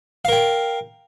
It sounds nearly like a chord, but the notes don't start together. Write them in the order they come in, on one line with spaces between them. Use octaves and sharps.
F5 A#4 G5